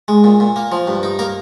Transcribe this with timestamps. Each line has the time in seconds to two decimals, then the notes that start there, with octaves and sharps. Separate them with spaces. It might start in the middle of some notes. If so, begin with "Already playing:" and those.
0.08 G#3
0.24 A#2
0.40 A#2
0.56 A#3
0.72 F3
0.87 G2
1.03 D#4
1.19 A#3 A#4